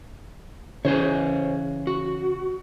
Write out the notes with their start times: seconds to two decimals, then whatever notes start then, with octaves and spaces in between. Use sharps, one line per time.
0.85 C#3 E3 G#4 C5 C#5
1.87 F#4